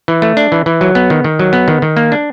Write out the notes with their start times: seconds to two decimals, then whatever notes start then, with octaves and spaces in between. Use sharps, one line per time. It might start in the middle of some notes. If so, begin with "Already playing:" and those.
0.08 E3
0.22 A3
0.37 D4
0.52 E3
0.66 E3
0.81 F#3
0.95 B3
1.10 D#3
1.24 D#3
1.39 F#3
1.53 B3
1.68 D#3
1.82 D#3
1.97 A#3
2.12 D4